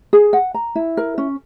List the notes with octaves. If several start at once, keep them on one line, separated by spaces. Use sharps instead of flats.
G#4
F#5
A#5
E4
A#4
C#4